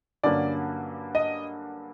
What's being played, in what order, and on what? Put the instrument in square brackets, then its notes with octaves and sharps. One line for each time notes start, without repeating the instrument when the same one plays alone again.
[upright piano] G2 D3 F#3 A#3 C#4 D5
D#5